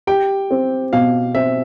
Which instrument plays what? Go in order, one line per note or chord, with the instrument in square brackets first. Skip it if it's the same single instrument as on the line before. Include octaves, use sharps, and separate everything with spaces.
[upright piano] G4 [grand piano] G5
[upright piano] C4
[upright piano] B2 [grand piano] F5
[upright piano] C4 [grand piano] E5